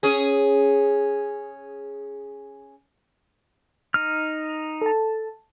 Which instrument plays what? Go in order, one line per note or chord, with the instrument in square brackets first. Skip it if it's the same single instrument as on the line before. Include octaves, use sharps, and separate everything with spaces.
[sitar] C#4 G#4
[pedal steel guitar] D#4 F6
[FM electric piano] A4 A5